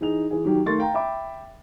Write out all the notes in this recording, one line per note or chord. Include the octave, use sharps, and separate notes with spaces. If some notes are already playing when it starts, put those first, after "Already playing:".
E3 D#4 G#4 F7
E3 G#4
D#3 F#3 G4
D#3 A3 A#4 C6 C#6 A6
F5 G5 A#5
E5 G5 B5 D6